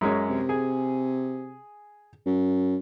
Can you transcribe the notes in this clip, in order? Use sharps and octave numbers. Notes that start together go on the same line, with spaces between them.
F#2 G#3 C#4
C3
G#4 G#5
F#2